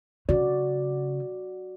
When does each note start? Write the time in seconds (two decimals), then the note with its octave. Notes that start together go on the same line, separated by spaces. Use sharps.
0.29 C#3 F#4 D5